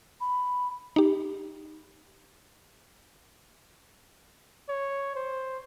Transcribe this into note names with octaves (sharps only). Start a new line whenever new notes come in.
B5
D#4 G4
C#5
C5